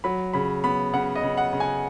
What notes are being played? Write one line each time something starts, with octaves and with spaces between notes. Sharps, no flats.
F#3 B5
C#3 B5
B3 B5
C#3 F#5
D#5
C#3
F#5
C#3
G#5